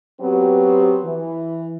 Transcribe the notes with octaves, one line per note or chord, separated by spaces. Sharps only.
F#3 B3 C4 F#4 G4
E3